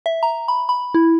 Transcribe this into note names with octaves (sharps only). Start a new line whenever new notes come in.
E5
A#5
B5
B5
E4